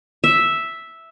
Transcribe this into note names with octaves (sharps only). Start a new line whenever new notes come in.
E5